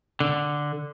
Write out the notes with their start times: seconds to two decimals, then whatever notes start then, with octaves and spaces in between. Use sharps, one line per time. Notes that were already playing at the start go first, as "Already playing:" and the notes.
0.20 D3